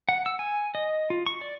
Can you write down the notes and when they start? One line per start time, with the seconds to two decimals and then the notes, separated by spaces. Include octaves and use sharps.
0.09 F#5
0.26 E6
0.39 G#5
0.75 D#5
1.10 F4
1.26 C#6
1.41 D5